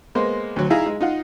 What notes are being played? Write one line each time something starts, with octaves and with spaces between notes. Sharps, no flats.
G#3 A#3 B3 C5
D2 F#3
D#4 E4 G#4 E5 F5 A#5
G#3
D#4 F4 F#5